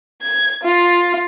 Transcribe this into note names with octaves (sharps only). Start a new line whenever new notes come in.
G#6
F4